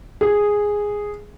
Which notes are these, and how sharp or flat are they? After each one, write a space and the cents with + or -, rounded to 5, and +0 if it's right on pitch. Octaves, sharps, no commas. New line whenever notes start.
G#4 -5